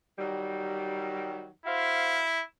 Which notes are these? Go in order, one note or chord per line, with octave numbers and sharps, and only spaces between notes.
D#3 F#3 G3
E4 F#4 C5 F5